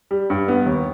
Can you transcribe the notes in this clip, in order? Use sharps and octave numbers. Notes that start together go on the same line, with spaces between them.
G3
G2
B3
D#2